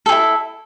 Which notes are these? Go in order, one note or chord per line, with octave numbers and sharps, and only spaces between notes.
E4 G#4 A4